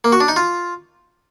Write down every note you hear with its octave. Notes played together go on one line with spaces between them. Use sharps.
A#3
F#4
D4
D#4
F4